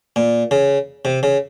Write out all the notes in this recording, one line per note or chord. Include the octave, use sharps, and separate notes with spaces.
A#2
C#3
C3
C#3